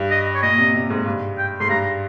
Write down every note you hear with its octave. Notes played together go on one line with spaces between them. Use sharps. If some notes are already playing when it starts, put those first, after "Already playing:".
Already playing: G2
D#5
C#5
A#2 D#5
C3
C3
G#2
G2
G5
G#2 C6
G2 A#5